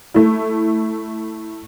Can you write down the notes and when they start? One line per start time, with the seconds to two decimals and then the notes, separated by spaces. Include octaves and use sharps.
0.14 A3 E4